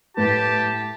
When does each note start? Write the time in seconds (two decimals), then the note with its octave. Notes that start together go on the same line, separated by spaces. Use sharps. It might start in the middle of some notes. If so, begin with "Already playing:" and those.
0.17 A2 G4 B4 A5